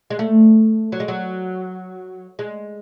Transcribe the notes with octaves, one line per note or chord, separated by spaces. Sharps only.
G#3
A3
F#3
G#3
F#3
G#3